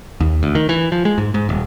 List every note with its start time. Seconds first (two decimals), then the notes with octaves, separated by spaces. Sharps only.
0.20 D#2
0.43 D2
0.55 D#3
0.69 E3
0.92 F3
1.05 G#3
1.18 G#2
1.34 G#2
1.49 D#1